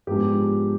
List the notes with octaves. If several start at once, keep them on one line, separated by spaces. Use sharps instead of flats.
G#2 F3 G#3 B3 D4 G4